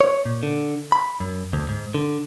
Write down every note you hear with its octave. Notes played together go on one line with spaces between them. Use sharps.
C#5
A#2
D3
B5
F#2
D2
G#2
D3